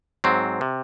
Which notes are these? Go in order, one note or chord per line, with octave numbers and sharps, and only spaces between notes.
G#2 F#3 C4
C3